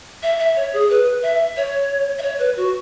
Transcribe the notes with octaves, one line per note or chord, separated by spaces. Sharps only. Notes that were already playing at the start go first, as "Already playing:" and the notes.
E5
E5
C#5
G#4
B4
E5
C#5
E5
C#5
B4
F#4